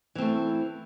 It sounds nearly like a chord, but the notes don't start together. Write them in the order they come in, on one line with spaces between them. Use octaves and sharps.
E3 C4 A3